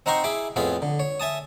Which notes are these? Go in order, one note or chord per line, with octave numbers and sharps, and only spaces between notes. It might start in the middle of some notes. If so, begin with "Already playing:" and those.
C4 D#4 F#5 A#5 C6 C#6
E4 G#4 B5 D6
F2 A2 B3 F4 G#4 B5
D3
C#5
E5 G#5 A5 D#6